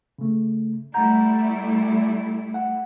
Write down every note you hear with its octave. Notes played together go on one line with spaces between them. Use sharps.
C#3 A3
G3 A3 E4 F#5 A#5 G6
F#5